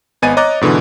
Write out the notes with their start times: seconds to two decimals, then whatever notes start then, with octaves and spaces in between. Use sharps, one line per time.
0.22 G#1 B3 D#5 G#5 A6 D#7
0.37 C#5 D#5 A#5 D6 F#6 A6
0.61 G#2 B2 D3 E3